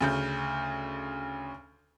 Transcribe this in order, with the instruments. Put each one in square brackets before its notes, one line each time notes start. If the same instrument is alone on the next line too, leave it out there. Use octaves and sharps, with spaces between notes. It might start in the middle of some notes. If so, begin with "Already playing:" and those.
[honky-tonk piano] D2 C#3 G6